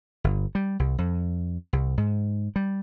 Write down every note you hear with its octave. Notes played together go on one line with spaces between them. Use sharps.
G1
G3
C2
F2
C2
G#2
G3